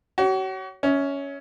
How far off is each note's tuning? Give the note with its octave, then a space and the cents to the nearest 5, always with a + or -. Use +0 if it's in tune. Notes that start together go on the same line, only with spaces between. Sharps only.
F#4 +40 C#5 +0
C#4 +10 E5 -30